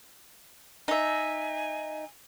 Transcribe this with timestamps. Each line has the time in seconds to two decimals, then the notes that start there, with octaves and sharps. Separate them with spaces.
0.88 D#4 E5 G#5